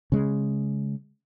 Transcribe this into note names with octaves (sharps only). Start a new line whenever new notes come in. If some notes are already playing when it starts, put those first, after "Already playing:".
C#3 G#3